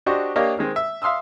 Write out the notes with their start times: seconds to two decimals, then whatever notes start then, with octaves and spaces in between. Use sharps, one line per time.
0.06 D4 F#4 G4 C5 D#5 C#6
0.36 A#3 D4 G4 C#5 D#5 F5
0.59 D#3 G#3 C4
0.76 E5
1.02 E5 F5 C6 D#6 E6